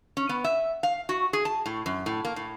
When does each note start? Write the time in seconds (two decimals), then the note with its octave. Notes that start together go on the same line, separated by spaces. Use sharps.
0.17 C#4
0.29 B3
0.44 E5
0.83 F5
1.09 F#4
1.33 G#4
1.45 A5
1.66 A2
1.86 F#2
2.06 A2
2.25 A#3
2.36 A2